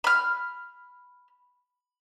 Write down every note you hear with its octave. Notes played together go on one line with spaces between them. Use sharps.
B5 F6